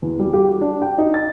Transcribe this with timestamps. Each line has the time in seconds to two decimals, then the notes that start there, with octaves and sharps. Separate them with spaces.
0.02 E2
0.19 G3
0.33 G4
0.49 F#4
0.61 D4
0.82 G5
0.98 D#4
1.14 A6